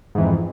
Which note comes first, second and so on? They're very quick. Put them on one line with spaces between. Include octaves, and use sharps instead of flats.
G#2 E3 F2